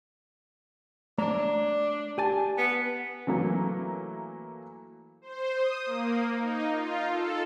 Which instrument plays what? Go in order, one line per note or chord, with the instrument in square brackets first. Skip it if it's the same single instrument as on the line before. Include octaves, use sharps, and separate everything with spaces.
[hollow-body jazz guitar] A3 C#5 A#5 [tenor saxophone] D4
[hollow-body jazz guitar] G4 G#5 A5
[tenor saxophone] B3
[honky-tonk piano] E3 F#3 A3 A#3
[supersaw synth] C5
D#6
A#3
D#4
F4
A4